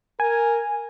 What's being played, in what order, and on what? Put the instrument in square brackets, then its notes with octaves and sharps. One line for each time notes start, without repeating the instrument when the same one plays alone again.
[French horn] A#4 [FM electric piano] G#5